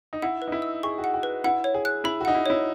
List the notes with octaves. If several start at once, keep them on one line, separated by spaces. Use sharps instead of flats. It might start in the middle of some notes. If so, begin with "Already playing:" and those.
D#4
E4 F#5
B4
D#4
E4
E6
G#4 C#6
F#4
F#5
F#4
B4
E4 F#5
C#5
G#4
F#6
E4 B5
F#4
D#4 F#5
E4
E4 C#5